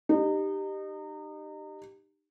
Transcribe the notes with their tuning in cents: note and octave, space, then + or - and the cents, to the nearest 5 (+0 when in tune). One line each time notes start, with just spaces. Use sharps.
D#4 -30 G4 +0